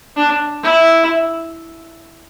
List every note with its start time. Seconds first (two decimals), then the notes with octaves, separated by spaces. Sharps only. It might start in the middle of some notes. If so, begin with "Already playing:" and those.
0.17 D4
0.63 E4